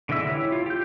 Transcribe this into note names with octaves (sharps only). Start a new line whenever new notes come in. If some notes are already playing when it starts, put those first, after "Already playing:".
D3 E3 G#3 E5 E6
E4 G4 C#5
F4
G4 G6